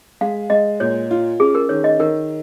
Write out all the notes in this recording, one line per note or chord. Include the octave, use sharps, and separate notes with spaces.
G#3 F5
G#3 D#5
A#2 C#5
F4
C#4 G#4
A#4
D#3 C#5
D#5
D#3 A#4